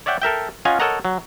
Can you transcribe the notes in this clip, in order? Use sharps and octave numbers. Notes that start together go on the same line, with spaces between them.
C#5 D5 E5 F#5 G5
A4 A#4 E5 G5
C#4 F4 D#5 F5 F#5 G#5
A4 A#4 C#5 D#5 F#5 A#5
F#3